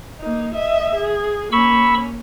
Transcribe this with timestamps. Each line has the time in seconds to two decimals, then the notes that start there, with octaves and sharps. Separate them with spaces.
0.19 A#3 D#4
0.54 D#5 E5
0.95 G#4
1.52 A#3 C#4 B5 C#6 E6